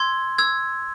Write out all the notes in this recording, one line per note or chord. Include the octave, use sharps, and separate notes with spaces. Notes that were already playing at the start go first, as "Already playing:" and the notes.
Already playing: C6 E6 G#6
E6 G#6